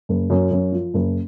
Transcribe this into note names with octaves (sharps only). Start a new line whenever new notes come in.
F#1
F#2
F#2
F3
F#1